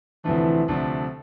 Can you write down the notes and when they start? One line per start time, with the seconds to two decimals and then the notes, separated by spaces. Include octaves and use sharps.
0.24 D2 C3 E3 F3 A3 D4
0.68 D2 C3 F3 A3 D4